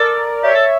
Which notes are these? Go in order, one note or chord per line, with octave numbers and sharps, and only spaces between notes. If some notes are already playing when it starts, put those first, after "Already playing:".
Already playing: A4 A#4 D5
G4 C#5 E5
A4